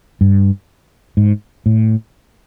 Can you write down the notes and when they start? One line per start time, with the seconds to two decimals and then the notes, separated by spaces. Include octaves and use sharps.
0.21 G2
1.17 G#2
1.66 A2